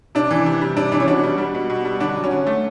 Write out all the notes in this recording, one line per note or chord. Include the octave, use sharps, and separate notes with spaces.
C3 D4
E3
C3
G3
C3 D4
E3 D4
C#4
B2 D4
G3
G3
B2
B2
G3
D3 D4
F#3
C#4
D3
A3